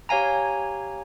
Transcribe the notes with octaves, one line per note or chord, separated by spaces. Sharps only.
G4 C#5 F5 G#5 A#5